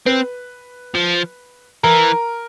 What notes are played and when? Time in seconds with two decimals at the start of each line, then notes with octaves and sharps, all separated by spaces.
0.06 C4 B4
0.95 F3
1.83 E3 A#4